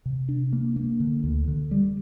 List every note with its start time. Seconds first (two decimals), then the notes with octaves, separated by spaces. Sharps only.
0.06 C3
0.29 D4
0.53 A#3
0.76 A#3
1.00 D3
1.24 D2
1.48 D3
1.71 G3